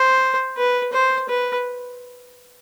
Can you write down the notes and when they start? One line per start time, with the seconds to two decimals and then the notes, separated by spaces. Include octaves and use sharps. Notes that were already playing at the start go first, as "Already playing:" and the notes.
Already playing: C5
0.57 B4
0.93 C5
1.29 B4